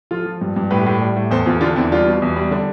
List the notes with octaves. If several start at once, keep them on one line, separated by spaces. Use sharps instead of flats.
F3 F4 A4
F3
G2
G2
A2 G4 B4
A2
G3
A2
E2 A4 C5
E2 F4 A4
D3 D4 F4
E2 C4 E4
G3 D4 F4
B2
E2
G3
D3 D4